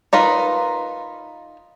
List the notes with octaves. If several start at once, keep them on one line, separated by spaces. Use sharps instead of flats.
D#4 F4 A#4 B4